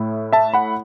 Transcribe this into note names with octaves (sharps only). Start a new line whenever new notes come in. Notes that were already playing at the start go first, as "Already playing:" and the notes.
Already playing: A2 A3 E4
E5 A5
F#5 B5